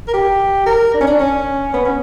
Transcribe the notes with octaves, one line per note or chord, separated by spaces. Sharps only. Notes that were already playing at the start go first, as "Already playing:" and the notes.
A#4
G4
A#4
D4
C#4
D4
C#4
B3
C#4